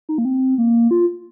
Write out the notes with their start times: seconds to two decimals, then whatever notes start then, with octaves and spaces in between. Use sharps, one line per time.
0.09 D#4
0.18 A#3
0.25 C4
0.58 A#3
0.91 F4